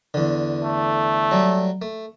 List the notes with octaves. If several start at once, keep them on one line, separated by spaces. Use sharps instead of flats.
E2 D3
A3
F#3 G3
A3